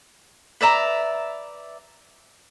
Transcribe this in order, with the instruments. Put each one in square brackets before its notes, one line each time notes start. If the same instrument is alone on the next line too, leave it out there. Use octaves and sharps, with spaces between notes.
[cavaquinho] B4 D5 E5 A#5